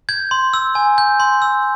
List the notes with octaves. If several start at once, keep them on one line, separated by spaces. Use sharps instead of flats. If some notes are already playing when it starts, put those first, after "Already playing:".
G6 G#6
C6
E6
G#5
G6
C6
E6